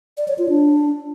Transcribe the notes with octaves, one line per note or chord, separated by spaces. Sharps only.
D5
C#5
F4
D4